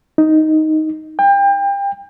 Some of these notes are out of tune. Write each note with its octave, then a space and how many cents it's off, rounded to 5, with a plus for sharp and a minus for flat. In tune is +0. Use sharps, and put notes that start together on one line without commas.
D#4 +5
G5 +30